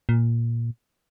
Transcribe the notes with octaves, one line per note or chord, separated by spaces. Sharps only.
A#2